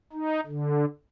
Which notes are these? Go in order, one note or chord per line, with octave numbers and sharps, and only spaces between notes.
D#4
D3